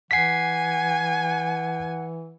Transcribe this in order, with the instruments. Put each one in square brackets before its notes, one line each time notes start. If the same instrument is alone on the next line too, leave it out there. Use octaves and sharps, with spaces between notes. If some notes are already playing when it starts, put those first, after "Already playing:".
[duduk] E3 [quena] F#5 [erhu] G#5 [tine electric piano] B6 C7